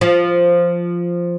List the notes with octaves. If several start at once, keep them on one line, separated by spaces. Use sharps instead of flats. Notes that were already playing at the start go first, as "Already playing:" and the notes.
F3